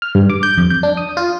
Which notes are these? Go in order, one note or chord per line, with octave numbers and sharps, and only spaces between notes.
F6
G2
D6
G6
F2
G6
D4
D#6
F4